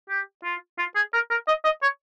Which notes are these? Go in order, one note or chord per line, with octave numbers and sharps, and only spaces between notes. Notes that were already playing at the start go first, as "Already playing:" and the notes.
G4
F4
F4
G#4
A#4
A#4
D#5
D#5
C#5